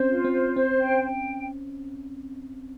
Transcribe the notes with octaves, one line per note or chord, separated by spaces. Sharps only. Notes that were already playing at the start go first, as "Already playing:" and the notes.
Already playing: C4 C#4 C5
F4
C4
C5
C4 C5
G5
G5